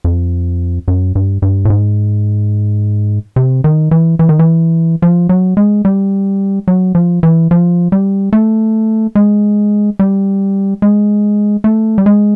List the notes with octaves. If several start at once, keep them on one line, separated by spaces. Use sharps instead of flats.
F2
F#2
G2
G2
A2
G#2
C3
D#3
E3
E3
D#3
E3
F3
F#3
G#3
G3
F#3
F3
E3
F3
G3
A3
G#3
G3
G#3
A3
G3
G#3